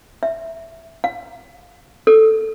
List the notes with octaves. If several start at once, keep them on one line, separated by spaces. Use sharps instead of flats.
E5
F5
A4